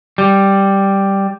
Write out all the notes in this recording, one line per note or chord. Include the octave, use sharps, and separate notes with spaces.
G3